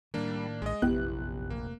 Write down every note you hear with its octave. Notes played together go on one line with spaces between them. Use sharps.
A2 D#3 G3 A#3 D4
A#1 G#3 D#5
F1 A#1 F#2 A#2 B3 E4 G4 F#6
F1 A#3